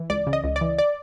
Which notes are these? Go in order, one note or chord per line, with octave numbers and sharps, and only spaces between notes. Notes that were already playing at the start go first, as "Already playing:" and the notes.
Already playing: E3
C#2 D5
C#3
D#5
C#2
D5
E3
D5